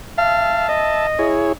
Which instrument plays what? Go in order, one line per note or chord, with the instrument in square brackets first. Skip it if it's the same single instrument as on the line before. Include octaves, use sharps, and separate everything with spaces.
[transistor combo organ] E5 A5 [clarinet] F5
[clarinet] D#5
[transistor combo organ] E4 G#4 C#5